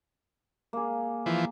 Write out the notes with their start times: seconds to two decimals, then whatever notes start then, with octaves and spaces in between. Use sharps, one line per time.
0.73 A#3 G#4
1.26 E3 F3